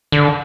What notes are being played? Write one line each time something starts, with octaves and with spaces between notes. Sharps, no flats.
D3